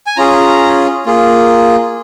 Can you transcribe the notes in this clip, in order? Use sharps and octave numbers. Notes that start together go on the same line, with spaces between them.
G#5
C#4 F4 G#4 A#5
A#3 F4 G#4